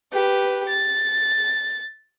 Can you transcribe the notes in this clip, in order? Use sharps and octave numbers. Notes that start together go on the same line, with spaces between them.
G4 B4
A6